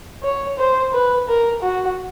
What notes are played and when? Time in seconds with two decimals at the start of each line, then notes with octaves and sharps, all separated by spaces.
0.23 C#5
0.58 C5
0.94 B4
1.29 A#4
1.62 F#4